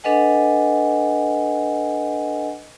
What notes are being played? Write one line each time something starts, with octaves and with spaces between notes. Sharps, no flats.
D4 A4 B4 D#5 F#5 G#5